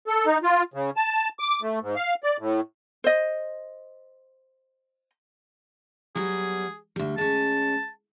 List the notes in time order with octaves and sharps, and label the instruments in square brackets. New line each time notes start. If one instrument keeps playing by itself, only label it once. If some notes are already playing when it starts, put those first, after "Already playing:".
[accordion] A4
D#4
F4
C#3
A5
D6
A3
G#2
F5
D5
A2
[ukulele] C5 D#5
[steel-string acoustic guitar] F#3 G3 B3 [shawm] G#4
[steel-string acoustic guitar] D2 G3
[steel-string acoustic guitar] G#3 C#4 [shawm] A5